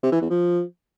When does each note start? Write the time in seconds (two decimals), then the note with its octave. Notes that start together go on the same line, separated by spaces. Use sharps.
0.03 C3
0.12 E3
0.21 E2
0.30 F3